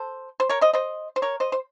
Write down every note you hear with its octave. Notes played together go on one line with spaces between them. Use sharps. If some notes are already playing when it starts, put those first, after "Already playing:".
Already playing: A4 C5
C5
A#4 C#5
C5 D#5
C5 D#5
C5
A#4 C#5
C5 D#5
C5